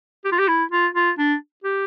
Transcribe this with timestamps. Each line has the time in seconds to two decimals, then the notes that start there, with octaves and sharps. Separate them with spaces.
0.25 G4
0.32 F4
0.39 G4
0.48 E4
0.72 F4
0.95 F4
1.18 D4
1.64 G4